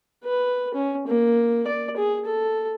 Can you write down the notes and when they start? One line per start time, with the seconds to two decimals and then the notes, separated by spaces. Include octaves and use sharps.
0.25 B4
0.74 C#4
1.07 A#3
1.67 D5
1.97 G#4
2.26 A4